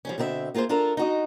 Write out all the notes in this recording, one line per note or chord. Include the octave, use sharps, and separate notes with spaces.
F3 G3 C#4
B2 D3 C4 A#4 E5
A#3 F4 G#4 B4 C5
D4 F4 A4 A#4
D#4 F#4 D#5